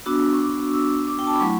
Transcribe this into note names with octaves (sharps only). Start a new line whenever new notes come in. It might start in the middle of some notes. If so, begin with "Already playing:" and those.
B3 D4 F#4 E6
C#6
D6
E6
D6
G5
A5
B5
F#3 A3 E4 C#6